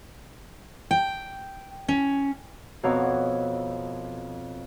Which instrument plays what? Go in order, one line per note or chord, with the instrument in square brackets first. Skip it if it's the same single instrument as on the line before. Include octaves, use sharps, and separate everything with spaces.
[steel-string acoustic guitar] G5
C#4
[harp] F2 B2 C#5 A#5 D6 E6